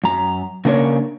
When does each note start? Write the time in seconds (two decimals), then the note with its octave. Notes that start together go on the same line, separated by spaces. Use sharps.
0.04 F#2 A#5
0.65 C#3 A#3 D4 A#4 C#5